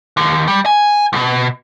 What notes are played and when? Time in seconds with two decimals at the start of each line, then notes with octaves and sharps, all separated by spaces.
0.17 D#2
0.48 G3
0.66 G#5
1.13 C2 B2